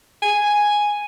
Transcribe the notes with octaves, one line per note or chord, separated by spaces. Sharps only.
G#5